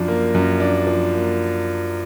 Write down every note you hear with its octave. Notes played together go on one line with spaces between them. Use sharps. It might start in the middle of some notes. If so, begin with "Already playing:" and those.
Already playing: F#2 F3 D4
A#3
F#2
D4
F3
A#3